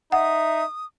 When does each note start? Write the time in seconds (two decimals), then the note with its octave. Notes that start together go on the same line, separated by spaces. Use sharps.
0.12 D#4 E5 F#5 D#6